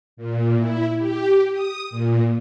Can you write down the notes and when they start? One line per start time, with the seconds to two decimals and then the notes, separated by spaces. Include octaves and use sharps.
0.17 A#2
0.57 E4
0.99 G4
1.52 D#6
1.90 A#2